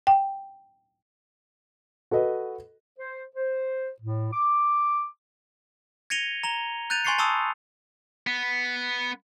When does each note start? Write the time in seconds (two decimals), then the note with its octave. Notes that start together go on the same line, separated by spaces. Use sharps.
0.07 G5
2.11 F#4 A4 B4 D#5
2.99 C5
3.35 C5
4.00 A2
4.33 D6
6.10 G#6 A#6 C#7 D#7 F7 G7
6.44 A#5 F7 G7
6.90 F#6 G6 A6 D#7 F7
7.05 G#5 C6 C#6 A6 C7 C#7
7.18 A5 B5 C#6 D#6 E6
8.27 B3